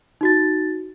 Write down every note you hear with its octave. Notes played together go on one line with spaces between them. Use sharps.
D#4 F#4 A6